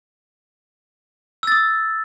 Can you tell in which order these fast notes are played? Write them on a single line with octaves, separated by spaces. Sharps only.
E6 A6 D#6